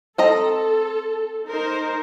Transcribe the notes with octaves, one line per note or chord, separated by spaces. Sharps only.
C4 A4 D#5 A#5
D#4 A#4 C5